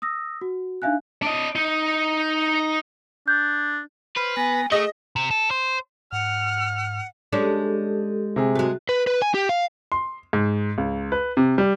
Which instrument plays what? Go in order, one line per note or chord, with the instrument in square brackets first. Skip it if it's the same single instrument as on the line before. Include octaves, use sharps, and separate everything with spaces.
[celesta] D#6 E6 A#6
F#4
D4 D#4 E5 F5 G#5 F#6
[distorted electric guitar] D4 D#5
D#4
[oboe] D4 [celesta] G6
[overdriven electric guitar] B4 [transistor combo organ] C5 F6
[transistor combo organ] B3 A#5 [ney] G#5
[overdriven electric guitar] A3 [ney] G#4 [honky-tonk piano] D#5 [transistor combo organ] A#5 C#6 D#6
[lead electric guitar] C3
A4
C5
[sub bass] G#2 [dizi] F#5 [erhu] F6
[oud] G#3 C#4 D4 [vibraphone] G4 A4
[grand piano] C3 G#4
[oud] G#3 A3 [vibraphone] F#4
[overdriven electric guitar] B4
B4
G#5
G4
F5
[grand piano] C6
G#2
C#2
B4
C3
G3